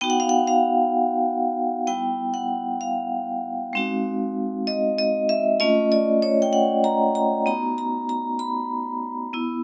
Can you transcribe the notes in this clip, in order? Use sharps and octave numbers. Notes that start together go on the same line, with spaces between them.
B3 D#4 F#4 G5
F#5
F5
F#5
F5
G3 B3 E4 G5
F#5
F5
G#3 C4 D#4 F#4
D#5
D#5
E5
A3 C#4 F4 D#5
D5
C#5
G5
F#5
A#5
A#5
B3 D#4 F#4 A#5
A#5
A#5
B5
B3 E4